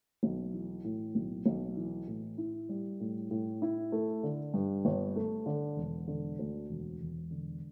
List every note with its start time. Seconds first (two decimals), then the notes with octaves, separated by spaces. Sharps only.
0.23 B1
0.54 E3
0.84 A2
1.15 B1
1.46 B1
1.77 E3
2.08 A2
2.38 E4
2.69 G3
3.00 A2
3.31 A2
3.62 E4
3.92 A3
4.23 D3
4.54 G2
4.85 G1
5.16 A3
5.46 D3
5.77 E1
6.08 D3
6.39 D2
6.70 E1
7.00 E1
7.31 D3